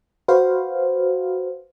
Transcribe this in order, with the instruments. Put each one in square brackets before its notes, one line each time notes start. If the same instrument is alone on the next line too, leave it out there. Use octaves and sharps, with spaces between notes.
[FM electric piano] F#4 B4 C5 F5